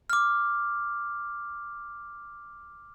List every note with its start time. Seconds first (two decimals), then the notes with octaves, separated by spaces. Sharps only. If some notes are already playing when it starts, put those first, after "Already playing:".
0.10 D6 F6